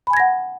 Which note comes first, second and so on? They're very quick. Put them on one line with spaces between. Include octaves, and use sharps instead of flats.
B5 G#5 G#6 A#6 F#5